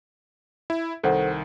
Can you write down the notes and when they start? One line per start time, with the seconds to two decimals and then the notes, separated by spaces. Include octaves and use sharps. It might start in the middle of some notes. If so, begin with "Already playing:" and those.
0.70 E4
1.03 C2 D#3 A4 C5 F#5